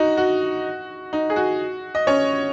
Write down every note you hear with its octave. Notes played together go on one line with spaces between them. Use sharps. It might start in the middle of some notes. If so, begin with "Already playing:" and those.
Already playing: D#4 F#4
F#4
D#4
G#4
F#4
D#5
C#4 C#5